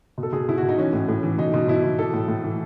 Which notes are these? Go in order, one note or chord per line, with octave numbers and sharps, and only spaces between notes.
B2
A4
B2 G#4
B2 E4
F#4
B2
D#4
E3 C#4
A2
A2
E3
B2 D#4
B2
B2 E4
B2
E3 A4
A2
A2
E3